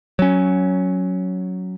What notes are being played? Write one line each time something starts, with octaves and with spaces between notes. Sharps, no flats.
F#3 C#4